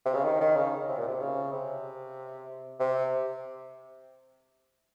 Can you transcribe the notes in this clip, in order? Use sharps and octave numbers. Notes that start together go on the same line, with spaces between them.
C3
C#3
D#3
D#3
C#3
C3
A#2
C3
C#3
C3
C3